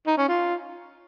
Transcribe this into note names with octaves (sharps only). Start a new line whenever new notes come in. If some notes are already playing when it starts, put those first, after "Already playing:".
D#4
C#4
F4